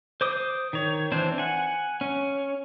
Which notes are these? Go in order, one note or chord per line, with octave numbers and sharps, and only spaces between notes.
C5 D6 D#6
D#3 C#5
E3 C4 D4 C5
F#5 G#5
C#4